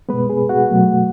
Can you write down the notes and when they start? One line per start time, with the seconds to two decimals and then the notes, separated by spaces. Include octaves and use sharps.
0.09 B2 G#3 B3 B4
0.30 G#4
0.49 F#4 F#5
0.70 B2 F#3 A3